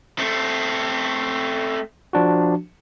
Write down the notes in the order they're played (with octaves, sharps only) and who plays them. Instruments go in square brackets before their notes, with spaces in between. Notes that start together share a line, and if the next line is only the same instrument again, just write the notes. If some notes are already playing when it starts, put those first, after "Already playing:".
[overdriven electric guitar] A3 C4
[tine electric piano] F3 D4 F#4